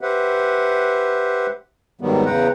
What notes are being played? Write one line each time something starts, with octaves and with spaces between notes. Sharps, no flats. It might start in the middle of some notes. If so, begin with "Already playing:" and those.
G4 B4 C5 E5 F#5
G#2 D#3 F#3 G3 B3
E2 C#3 B4 F#5 G5 A#5